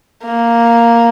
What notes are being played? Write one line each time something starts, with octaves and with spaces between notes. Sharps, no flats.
A#3